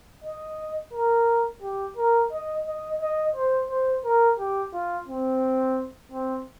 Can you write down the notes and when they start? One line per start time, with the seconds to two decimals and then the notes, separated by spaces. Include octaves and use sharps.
0.24 D#5
0.93 A#4
1.62 G4
1.97 A#4
2.32 D#5
2.67 D#5
3.01 D#5
3.36 C5
3.70 C5
4.05 A#4
4.39 G4
4.73 F4
5.08 C4
6.12 C4